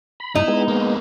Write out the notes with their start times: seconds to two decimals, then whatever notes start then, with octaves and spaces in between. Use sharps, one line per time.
0.20 B5
0.35 G2 D#4 E4
0.48 G#3 B3
0.68 A#3 C4